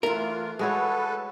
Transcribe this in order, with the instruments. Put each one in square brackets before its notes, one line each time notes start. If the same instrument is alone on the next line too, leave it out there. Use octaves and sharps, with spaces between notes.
[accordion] E3 F4 [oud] A3 E4 [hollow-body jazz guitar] A#4
[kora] G#3 F#4 C#5 [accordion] A4 B4